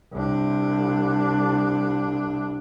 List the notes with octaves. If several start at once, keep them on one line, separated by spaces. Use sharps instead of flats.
C2 D4